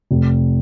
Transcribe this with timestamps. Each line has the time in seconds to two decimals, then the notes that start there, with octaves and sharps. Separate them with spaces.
0.11 F1